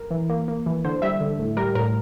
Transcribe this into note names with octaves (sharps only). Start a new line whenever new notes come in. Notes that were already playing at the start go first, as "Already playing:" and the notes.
Already playing: A#4
E3
A#3
A#3
E3
D3 C5
G3 E5
D3
A2
G3 A#4
A2 A#4